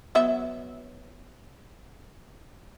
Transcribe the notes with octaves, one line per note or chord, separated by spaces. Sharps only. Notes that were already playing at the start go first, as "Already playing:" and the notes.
F#3 B3 E5